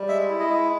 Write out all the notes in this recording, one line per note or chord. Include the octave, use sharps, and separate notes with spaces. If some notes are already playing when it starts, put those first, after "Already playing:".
Already playing: G3
G#3 E5
E4
D#5
G#3